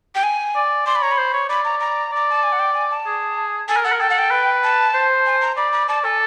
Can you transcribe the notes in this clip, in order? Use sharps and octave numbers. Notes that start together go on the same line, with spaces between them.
G5
G#5
D5
D5 C6
B5
C#5 A#5
B5
C5
C#5
D5 B5
A#5
A#5
D5 A#5
A5
G#5
F#5
G5
G#5
A5
G#4
A4 G#5
A#4
A4 F#5
A#4
A4 G5
F#5
G5
B4
A5
C5
G#5
A#5
D5 B5
B5
D5 A5
A4 G#5